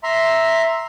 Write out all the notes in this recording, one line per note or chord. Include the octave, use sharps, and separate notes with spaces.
E5 A#5 C6